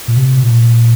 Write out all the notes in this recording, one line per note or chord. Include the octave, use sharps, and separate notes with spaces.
A#2
C3
A#2